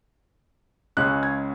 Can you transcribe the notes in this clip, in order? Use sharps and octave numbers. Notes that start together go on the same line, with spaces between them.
C#2 C#3 G#3 C#4 F#6
G#6